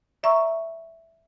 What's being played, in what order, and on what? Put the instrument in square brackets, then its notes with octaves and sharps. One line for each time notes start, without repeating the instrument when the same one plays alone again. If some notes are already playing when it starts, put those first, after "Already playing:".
[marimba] D5 E5 A#5 C#6 E6